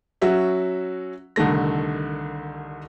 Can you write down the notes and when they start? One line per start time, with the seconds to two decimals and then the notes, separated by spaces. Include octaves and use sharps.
0.21 F#3 C#4 F#4 E5 F#5
1.36 C2 D3 D#3 A3 A#6